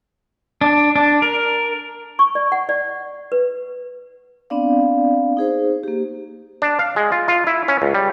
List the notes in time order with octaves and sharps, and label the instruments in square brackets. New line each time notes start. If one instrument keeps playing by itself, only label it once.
[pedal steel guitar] D4
D4
A#4
[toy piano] C#6
D5
F#5
D5
B4
[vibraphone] B3 C4 D4 D5 F5
D#4 G#4 C5
A#3 G4
[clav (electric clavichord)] D4
F5
G#3
F4
F4
E4
C#4
C#2
G3